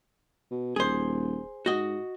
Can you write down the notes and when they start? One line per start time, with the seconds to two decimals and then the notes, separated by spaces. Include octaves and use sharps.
0.51 B2
0.76 D#1 G#4 C5
1.66 G#2 F#4 D#5